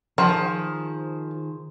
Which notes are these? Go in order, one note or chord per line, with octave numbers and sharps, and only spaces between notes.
D#3 F3 G#4 C5